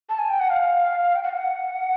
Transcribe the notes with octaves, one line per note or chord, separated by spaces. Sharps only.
A5
G#5
G5
F#5
F5
G5
F#5
F5
F#5